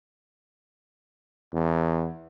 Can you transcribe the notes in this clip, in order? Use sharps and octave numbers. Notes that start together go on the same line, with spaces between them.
E2